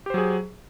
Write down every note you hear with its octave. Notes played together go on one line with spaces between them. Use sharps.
F#3 G4 G#4 C5